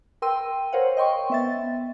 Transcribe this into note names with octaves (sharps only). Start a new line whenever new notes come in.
A#4 G5 C6 E6 D#7
A#4 C5 C#5 F5 F#5
D#5 G5 C6 C#6
B3 E5 A6